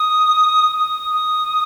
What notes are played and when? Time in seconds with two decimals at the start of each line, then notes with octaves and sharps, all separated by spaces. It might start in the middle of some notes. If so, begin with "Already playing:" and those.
Already playing: D#6
0.75 D#6
1.10 D#6